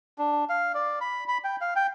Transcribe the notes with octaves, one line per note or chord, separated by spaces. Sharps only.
D4
F5
D5
B5
B5
G5
F5
G5